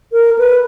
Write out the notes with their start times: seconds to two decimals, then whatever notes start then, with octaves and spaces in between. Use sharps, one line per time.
0.12 A#4
0.39 B4